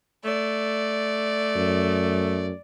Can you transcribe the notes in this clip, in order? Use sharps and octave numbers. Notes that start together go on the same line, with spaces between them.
A3 D5
F#2